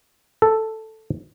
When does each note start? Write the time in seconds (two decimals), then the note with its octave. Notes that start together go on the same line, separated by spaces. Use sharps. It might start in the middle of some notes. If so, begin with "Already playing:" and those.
0.42 A4